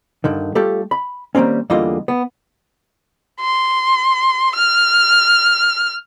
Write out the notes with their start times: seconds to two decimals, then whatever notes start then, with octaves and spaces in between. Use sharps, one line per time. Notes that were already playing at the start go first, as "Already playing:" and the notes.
0.24 G2 D3 D#3
0.55 G3 A3 F4 G4 A4
0.91 B5
1.35 D#3 G3 A#3 C4 C#4
1.70 E2 D3 G3 A#3 F4 D#5
2.08 B3
3.40 C6
4.56 F6